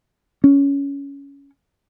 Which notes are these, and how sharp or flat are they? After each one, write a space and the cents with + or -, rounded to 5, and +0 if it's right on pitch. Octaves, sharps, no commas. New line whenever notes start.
C#4 +15